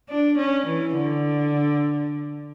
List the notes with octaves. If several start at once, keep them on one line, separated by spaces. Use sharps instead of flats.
D4
C#4
E3
D3